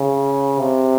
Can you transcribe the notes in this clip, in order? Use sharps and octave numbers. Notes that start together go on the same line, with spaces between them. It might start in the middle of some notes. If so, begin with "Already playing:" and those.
Already playing: C#3
C3